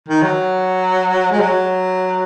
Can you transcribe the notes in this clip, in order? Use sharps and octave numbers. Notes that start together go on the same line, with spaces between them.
D#3
F#3
G#3
F#3